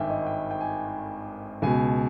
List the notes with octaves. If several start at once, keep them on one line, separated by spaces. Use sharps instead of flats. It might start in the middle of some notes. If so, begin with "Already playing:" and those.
Already playing: G#1 G2 D#3 E5 G5 G#5
D#5
G5
G5
G#5
C#2 B2 G#5